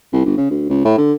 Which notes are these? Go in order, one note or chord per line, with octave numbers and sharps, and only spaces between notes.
C2
G1
C#3
D2
C#2
A2
D3